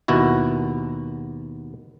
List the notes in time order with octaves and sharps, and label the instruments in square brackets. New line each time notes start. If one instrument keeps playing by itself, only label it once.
[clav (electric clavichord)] D#2 B2 E4 F#4